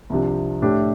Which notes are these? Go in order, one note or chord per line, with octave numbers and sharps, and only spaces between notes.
C2 C3 F3 D4 G4
A2 A3 D4 G4